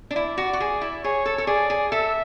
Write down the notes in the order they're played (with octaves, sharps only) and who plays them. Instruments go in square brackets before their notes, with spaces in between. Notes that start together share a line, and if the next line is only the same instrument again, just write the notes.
[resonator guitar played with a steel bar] D4
[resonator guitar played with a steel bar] E4 [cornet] D5
[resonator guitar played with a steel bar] F#4
F#4
G#4
E4
[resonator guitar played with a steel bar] G#4 [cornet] C#5
[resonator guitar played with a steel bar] A4
A4
[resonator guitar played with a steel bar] G#4 [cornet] D5
[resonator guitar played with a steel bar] G#4
[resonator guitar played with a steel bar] A4 [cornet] E5